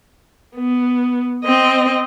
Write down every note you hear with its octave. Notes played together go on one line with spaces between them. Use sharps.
B3
C4 D#5